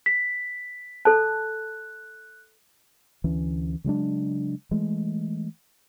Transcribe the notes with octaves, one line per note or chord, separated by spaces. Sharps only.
B6
A4 A5 F#6
D2 E3 C#4
C#3 F#3 G#3 D4
E3 G#3 A3